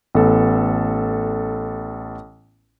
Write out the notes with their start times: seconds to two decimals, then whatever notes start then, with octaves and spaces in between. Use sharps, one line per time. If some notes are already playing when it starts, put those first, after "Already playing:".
0.15 A1 B3 A4